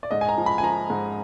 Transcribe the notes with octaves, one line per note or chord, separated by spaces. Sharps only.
D5
G#2 D#5
G#5
A#5
F3
B5
G#5
F3 A#5
G#2